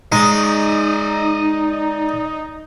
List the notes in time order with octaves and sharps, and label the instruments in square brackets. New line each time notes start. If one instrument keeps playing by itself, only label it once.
[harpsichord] G#3 [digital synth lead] D#4 [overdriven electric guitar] D5 D#5